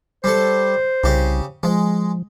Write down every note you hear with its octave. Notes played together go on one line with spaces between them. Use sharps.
G3 A4 C5
C2 C#3 G4
F3 G#3